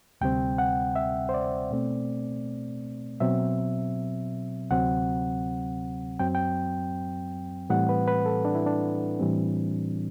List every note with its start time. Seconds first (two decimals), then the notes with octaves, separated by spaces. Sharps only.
0.21 D2 C3 G3 C4 G5
0.58 F#5
0.96 E5
1.29 C5
1.34 D5
1.71 B2 A3 C4
3.20 B2 F#3 C4 E5
4.71 D2 C3 F#3 C4 F#5
6.19 F#2 F#3 C4 G5
6.35 G5
7.69 A2 E3 G3 C4 F#5
7.89 B4
8.08 B4
8.26 A4
8.45 D4
8.55 E4
8.66 D4
9.19 A2 E3 G3 C4